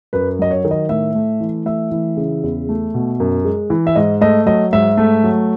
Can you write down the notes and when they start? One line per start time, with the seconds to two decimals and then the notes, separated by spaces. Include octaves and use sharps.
0.13 F#2 B4
0.39 F#3 D#5
0.51 C#5
0.65 D#3
0.71 D#5
0.89 A2 E5
1.15 A3
1.40 E3
1.65 A3 E5
1.91 E3
2.17 C#3
2.43 E2
2.69 A3
2.94 B2
3.20 F#2
3.45 G#3
3.70 E3
3.87 E5
3.96 G#2 D#5
4.21 A3 D#5
4.46 F#3 D#5
4.73 G#2 E5
4.98 A3
5.24 F#3